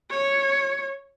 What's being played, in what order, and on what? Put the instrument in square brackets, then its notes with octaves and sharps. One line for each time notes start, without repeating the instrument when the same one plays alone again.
[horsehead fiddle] C#5